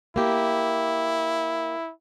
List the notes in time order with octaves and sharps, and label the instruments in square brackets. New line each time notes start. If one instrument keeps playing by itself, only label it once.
[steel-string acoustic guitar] A#3 G4 [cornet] E4